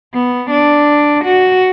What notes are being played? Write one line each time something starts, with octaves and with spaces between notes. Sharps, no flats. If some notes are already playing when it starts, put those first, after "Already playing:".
B3
D4
F#4